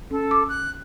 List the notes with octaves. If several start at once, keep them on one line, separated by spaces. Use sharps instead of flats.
C#4 A4
D6
F#6